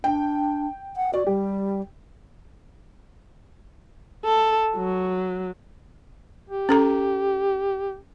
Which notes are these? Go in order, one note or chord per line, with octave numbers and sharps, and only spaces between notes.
D4 G5
F#5
F#4 D5
G3 G4
A4
F#3
G4
C#4 A4 A#5